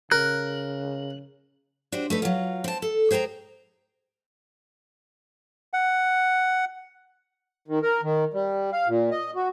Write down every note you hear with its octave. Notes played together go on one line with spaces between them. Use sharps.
C#3 A#4 F#6
D4 F#4 G4 C5
A3 D#4 B4
F#3 F4
C4 A5
A4
G#4 C5 G5 A5 A#5
F#5
D#3
A#4
D#3
G3
F5
A#2
D#5
F#4